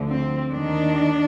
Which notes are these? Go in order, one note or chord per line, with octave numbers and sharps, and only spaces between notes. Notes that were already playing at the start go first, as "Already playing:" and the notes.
Already playing: D2 D3 F3
C4
D#2 D#3 D4